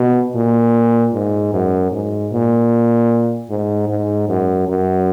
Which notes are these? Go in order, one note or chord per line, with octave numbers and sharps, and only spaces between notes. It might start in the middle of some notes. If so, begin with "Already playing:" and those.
Already playing: B2
A#2
G#2
F#2
G#2
A#2
G#2
G#2
F#2
F#2